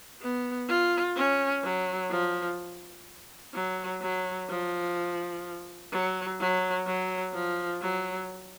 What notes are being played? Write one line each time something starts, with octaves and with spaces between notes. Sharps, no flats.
B3
F4
C#4
F#3
F3
F#3
F#3
F3
F#3
F#3
F#3
F3
F#3